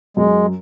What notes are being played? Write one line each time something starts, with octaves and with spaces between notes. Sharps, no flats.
F#2 G#3